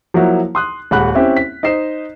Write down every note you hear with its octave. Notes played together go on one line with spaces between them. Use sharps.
F3 F#3 A#3 E4 F#4
C6 D#6 F#6
D#1 G#3 F#5 B5 F#6
C4 C#4 E4 G4 E5
B6
D#4 C5 D#5 C7 E7